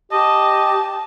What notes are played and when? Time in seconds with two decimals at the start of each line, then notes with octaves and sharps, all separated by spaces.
0.12 G4 D#5 A5